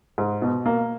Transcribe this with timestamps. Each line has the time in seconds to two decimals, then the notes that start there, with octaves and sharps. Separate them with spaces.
0.18 G#2
0.42 B2
0.66 A#3